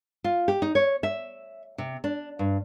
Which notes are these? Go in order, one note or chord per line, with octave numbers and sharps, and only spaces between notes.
F4
G4
D#4
C#5
E5
C3
D4
G2